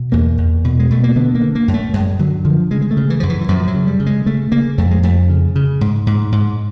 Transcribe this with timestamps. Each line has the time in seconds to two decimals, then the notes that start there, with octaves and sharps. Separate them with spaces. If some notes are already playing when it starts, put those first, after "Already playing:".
Already playing: B2
0.12 E2 A#3
0.38 E2
0.64 B2
0.79 G#3
0.90 B2 A3
1.04 A#3
1.16 D3 B3
1.35 A#3
1.41 D3
1.55 A#3
1.68 F#2
1.74 A3
1.94 F#2 G#3
2.19 D3 F#3
2.45 D3 F3
2.71 C#3 G#3
2.82 G#3
2.91 A3
2.97 C#3
3.10 E3
3.20 F#2 F3
3.29 E3
3.41 E3
3.48 F#2 F3
3.68 F#3
3.74 C#3
3.87 G3
4.00 C#3
4.06 G#3
4.26 C#3 A3
4.52 C#3 A#3
4.78 F2 A3
4.91 G#3
5.03 F2 A3
5.29 C#3
5.56 C#3
5.81 G#2
6.07 G#2
6.32 G#2